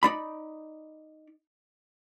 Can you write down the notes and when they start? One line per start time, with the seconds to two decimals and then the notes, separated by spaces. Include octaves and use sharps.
0.03 D#4 D5 B5